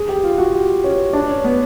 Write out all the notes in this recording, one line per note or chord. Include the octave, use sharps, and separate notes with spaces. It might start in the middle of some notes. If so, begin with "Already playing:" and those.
Already playing: G#4
G4
F4
F#4
G4
C#4
D4
C#4
B3